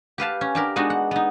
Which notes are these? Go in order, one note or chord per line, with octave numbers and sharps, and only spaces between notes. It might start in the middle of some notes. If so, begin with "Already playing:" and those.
G4 B4 F5 A5
C#4
D4 G4 A#4
G#3 B3 D4 D#4 F#4
F#5
B3 D#4